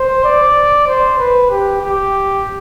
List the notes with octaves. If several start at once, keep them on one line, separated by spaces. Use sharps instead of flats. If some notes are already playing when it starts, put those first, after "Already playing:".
Already playing: C5
D5
C5
B4
G4
G4